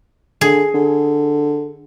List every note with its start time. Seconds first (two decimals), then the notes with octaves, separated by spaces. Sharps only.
0.41 D3 G#4
0.74 D3